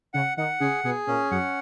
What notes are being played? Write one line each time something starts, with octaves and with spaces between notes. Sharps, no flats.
C#3 C#4 F#5
D#3 D#4 F#5
C#3 C#4 G#4
B2 B3 G#4
A#2 A#3 C#4
F#2 F#3 F#5